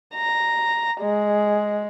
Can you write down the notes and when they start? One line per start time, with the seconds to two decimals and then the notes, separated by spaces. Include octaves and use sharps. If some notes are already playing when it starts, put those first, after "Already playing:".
0.15 A#5
1.01 G#3